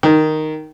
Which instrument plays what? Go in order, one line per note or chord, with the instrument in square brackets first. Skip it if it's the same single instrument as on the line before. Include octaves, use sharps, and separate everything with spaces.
[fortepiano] D#3